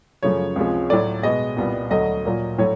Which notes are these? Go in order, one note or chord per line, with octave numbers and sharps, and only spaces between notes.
F#2 C#3 F3 A3 C#5
C#2 C3 F3 G#3
A2 F#3 A3 D5
B2 G#3 B3 D#5
C2 A#2 G3 B3
D2 D3 F#3 A3 D#5
A#2 F#3 A#3
A2 F#3 A3 C#5